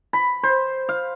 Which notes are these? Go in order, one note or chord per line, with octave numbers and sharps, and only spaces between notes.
B5
C5
F5